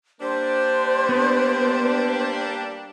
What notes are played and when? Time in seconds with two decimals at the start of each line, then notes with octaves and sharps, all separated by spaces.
0.21 G3 A#3 D4 C5
1.09 B3